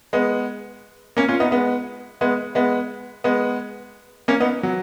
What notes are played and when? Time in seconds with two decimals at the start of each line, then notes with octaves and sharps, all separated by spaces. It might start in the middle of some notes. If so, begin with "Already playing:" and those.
0.13 G#3 B3
1.17 A#3 C#4
1.28 C#4 F4
1.40 B3 D#4
1.51 G#3 B3
2.21 G#3 B3
2.55 G#3 B3
3.24 G#3 B3
4.28 A#3 C#4
4.40 B3 D#4
4.63 F#3